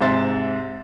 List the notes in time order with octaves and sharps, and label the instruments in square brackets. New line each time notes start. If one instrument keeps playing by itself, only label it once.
[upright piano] G#2 C3 C5 E5 C6 A6